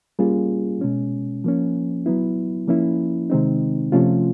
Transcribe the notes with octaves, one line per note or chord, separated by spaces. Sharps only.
G3 A#3 C#4 F4 G#4
B2 G#3 C#4
F3 A#3 C#4
F#3 B3 E4
F3 A#3 C#4 E4
C3 D#3 G#3 C4 D#4
C3 F3 A3 C#4 F4